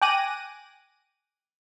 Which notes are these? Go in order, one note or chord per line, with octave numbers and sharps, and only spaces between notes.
G5 G#5 D6 F#6 A#6 D#7